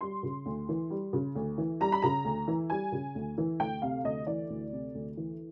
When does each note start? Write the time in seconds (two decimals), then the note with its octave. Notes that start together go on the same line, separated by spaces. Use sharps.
0.01 G3 C6
0.23 C#3
0.46 D2
0.69 E3
0.90 G3
1.13 C#3
1.35 D2
1.58 E3
1.80 G3 A#5
1.92 B5
2.02 C#3 A#5
2.25 D2
2.48 E3
2.70 G3 G#5
2.92 C#3
3.15 D2
3.38 E3
3.60 D2 G5
3.82 C3 F5
4.04 D2 D#5
4.27 E3 D5
4.50 D2
4.72 C3
4.95 D2
5.17 E3